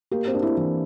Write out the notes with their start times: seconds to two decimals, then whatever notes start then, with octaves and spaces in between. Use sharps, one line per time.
0.12 A#3 G4
0.27 C4
0.35 D4
0.42 E4
0.57 E3